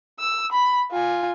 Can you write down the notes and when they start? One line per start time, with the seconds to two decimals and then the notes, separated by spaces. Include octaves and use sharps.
0.19 E6
0.52 B5
0.91 F4 G#5